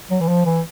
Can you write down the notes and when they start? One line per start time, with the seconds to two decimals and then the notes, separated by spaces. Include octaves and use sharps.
0.11 F#3
0.21 E3
0.29 F3
0.46 E3